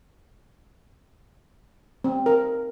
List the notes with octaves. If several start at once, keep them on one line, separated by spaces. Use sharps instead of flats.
C4
A#4